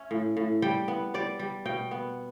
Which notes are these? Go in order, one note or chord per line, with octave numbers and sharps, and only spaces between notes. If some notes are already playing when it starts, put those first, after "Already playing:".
Already playing: C#4 E5
A2
A2
G3 G5
B3
G3 D5
G3
B2 G5
B3